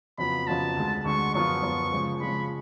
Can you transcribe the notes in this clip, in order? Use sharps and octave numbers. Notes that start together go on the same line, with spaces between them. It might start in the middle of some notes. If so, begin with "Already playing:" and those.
F2 C#3 F#3 B3 F4 B5
F2 C#3 F#3 B3 F4 A5
D2 D3 G#3
D2 D3 G#3 C#6
F#2 F3 B3 F4 C#6
F#2 F3 B3 F4
C#3 F3 G#3
C#3 F3 G#3 B5